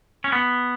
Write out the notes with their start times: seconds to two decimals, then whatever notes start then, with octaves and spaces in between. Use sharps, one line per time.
0.24 C#4
0.32 B3